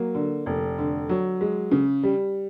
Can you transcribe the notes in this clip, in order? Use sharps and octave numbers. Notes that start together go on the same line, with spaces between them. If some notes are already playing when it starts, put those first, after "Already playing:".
Already playing: F#3 A#3
D3
F1
D3
F#3
G#3
C#3
G3